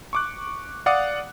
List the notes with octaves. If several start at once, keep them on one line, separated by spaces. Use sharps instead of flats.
C#6 D6 F#6
D5 F5 F#5 D6 D#6 F#6